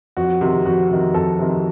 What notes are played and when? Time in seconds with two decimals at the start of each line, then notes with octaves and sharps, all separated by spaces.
0.17 F2 F#4
0.41 C3 D#3
0.66 F2 F#4
0.90 C3 D#3
1.14 F2 A4
1.39 C3 D#3